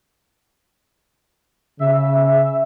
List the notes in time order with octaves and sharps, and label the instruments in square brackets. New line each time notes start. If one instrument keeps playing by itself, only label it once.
[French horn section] C#3 [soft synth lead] E5